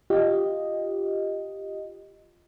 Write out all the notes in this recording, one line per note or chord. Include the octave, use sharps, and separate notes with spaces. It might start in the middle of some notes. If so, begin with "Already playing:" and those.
F4 G4 D#5